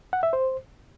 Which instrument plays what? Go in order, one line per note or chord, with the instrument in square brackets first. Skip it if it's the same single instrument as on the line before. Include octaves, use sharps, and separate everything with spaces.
[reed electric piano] F#5
E5
C5